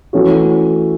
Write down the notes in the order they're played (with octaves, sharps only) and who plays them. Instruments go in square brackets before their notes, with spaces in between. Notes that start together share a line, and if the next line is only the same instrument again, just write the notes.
[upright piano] E3 A3 C#4 F#4